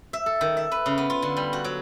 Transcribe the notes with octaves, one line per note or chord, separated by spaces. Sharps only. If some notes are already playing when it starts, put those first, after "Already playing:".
E5
A4
D#3
E5
B4
C#3
B3
F4
D3
G3
F#4
F#3